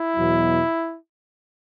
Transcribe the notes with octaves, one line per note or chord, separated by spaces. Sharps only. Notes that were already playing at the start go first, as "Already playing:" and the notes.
Already playing: E4
E2 B2 F#3